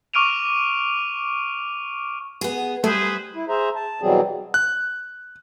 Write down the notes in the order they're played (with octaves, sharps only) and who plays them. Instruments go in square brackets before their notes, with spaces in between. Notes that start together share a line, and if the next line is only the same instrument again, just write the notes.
[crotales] C#6 D6 F6 D7 D#7 F7
[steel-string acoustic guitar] B3 G#4
[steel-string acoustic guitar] G3 [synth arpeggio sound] A3 [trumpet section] G#4 B4 C5
[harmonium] E4
G#4 C5 E5 A#5
A5
B2 E3 F#3 G3 C4 G#4
[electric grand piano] F#6